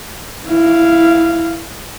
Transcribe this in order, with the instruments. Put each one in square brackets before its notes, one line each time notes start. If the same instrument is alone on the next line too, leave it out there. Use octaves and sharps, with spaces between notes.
[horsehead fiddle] E4 F5